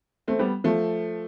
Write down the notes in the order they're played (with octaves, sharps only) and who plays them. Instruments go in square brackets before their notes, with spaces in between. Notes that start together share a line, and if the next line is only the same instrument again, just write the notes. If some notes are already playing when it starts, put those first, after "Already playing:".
[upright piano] A3 C4
G3 B3
F3 A3